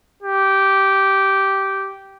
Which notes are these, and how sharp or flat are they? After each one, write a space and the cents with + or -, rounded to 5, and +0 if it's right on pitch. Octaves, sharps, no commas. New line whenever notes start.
G4 -10